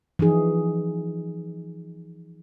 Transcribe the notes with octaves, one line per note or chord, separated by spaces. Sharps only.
E3 F3 D#4 G#4